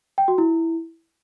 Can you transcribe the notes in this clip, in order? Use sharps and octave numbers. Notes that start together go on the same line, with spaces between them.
G5
F#4
E4